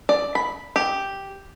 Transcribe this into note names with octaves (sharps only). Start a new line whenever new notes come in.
D5
B5
G4